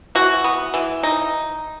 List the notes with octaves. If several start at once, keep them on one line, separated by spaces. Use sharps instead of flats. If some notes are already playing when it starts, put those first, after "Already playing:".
E3 F#4
B3
E3
D#4